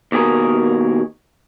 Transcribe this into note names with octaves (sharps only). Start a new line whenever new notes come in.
D#2 B2 G#4 A#4